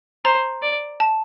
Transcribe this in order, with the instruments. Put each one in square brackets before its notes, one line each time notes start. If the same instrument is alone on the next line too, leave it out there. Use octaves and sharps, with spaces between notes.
[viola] C5 [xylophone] A#5
[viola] D5
[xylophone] A5